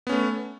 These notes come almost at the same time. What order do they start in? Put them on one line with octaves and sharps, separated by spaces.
B3 C#4 A3